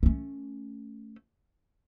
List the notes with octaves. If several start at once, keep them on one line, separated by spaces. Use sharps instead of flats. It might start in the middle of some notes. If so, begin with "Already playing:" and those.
A3 C#4